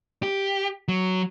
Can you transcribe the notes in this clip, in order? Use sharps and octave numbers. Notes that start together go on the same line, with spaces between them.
G4
F#3